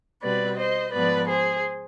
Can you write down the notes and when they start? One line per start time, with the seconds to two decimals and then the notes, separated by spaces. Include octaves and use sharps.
0.23 B2 G3 C4 B4 D5
0.57 C5 D#5
0.92 G#2 F3 B3 B4 D5
1.28 G#4 C5